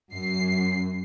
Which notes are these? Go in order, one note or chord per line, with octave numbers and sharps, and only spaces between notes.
F#2 C7